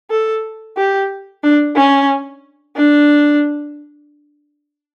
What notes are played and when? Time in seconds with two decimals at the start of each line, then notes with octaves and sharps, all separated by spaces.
0.11 A4
0.77 G4
1.43 D4
1.76 C#4
2.76 D4